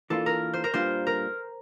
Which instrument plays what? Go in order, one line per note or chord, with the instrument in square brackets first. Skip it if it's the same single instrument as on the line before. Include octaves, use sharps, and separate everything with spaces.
[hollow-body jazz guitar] E3 A#3 D4 F4 [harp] A4
[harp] A#4
C5
A#4
[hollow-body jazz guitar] A#2 G3 D4 F4 [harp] C5
[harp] A#4